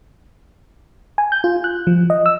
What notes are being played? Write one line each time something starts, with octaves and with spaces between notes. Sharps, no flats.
G#5
G6
F4
F#6
F3
D#5
E6